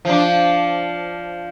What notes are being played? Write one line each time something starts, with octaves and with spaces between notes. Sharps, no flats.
F3 D4